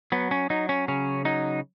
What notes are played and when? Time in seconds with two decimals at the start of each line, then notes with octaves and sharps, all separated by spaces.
0.12 F#3 B3
0.31 C#4
0.50 F#3 D#4
0.69 C#4
0.88 C#3 C#4
1.25 F#3 D#4